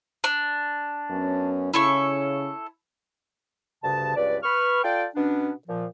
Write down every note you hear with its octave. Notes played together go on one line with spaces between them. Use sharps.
D4
F#2 B3 C#4
C#3 C#4 E4 A4 C#6
D2 G2 C#3 A5
C#2 G2 B4 D5
B4 C#6 F6
F4 A4 D5 G5
B2 B3 C#4 D4
A#2 F3